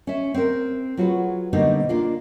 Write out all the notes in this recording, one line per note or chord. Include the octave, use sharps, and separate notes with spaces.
C#4 E5
C4 A#4
F#3 F4 F#4 G#4 B4
B2 D3 G3 A#3 C4 D#4
A#3 D4 F4